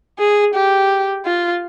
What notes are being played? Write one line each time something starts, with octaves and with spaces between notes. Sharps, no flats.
G#4
G4
F4